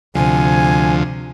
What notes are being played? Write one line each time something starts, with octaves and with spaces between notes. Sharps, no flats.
D2 C3 F3 G#5